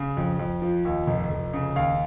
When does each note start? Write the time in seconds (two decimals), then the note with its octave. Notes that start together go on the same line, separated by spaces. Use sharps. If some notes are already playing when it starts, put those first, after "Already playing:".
Already playing: C#3
0.17 F2
0.39 F2
0.62 F3
0.85 D#2
1.07 F1
1.31 F1
1.53 C#3
1.76 D#2 F5